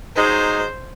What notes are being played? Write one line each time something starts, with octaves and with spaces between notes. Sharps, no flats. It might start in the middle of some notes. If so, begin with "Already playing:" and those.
F#3 G#3 D#4 C5